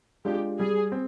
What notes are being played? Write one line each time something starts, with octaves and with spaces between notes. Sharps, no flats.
G#3 D4 F4 G4
G3 G#4
C4